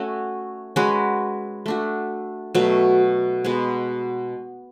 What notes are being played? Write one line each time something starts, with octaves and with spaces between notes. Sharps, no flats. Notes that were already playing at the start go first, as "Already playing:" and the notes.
Already playing: A3 C#4 F#4
G#3 C#4 F#4 B4
A3 D4 F#4
B2 F#3 A3
B2 G#3 B3